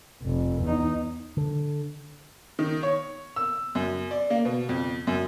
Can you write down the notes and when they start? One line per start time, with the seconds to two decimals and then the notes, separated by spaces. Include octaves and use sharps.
0.23 F1
0.63 E2 D#4
1.37 D3
2.59 D#3
2.83 C#5
3.36 E6
3.75 F#2
4.11 D5
4.30 A#3
4.45 B2
4.69 F2
5.07 F#2